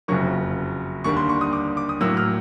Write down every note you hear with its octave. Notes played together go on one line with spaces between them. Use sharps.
F#1 F2 C#3 F#3 A#3 C#6
D#2 D3 G3 A#3 D4 C#6
C6
C#6
D#6
D6
D6
D#6
A2 F#3 A#3 E6
F6